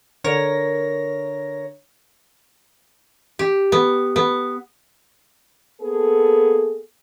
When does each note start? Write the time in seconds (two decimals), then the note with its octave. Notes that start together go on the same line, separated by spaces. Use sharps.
0.24 D3 A#4 C#5 A#6
3.39 G4
3.72 B3
4.16 B3
5.81 A#3 B3 G#4 A4